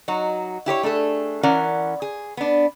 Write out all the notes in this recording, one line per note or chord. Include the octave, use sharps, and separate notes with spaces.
F#3 D#4 F#4
E4 G4 C5 C#5
A3 D4 G#4 A4
E3 C#4 A#4 D5 F#5
G#4
B3 D4